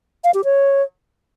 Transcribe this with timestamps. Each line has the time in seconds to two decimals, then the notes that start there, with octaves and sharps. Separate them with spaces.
0.24 F5
0.34 G4
0.44 C#5